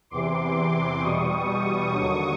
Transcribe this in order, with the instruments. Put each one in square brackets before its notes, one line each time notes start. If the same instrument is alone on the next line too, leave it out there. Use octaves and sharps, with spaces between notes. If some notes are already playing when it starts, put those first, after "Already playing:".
[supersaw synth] E2 C3 E3 C6 D6
E2 B2 G3 C#6 D#6
D#2 D3 F#3